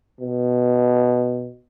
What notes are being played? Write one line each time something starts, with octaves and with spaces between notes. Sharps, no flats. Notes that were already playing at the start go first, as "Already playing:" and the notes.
B2